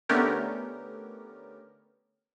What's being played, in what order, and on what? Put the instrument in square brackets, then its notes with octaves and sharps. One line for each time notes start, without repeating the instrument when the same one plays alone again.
[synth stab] D3 A3 B3 C#4 G4 A#4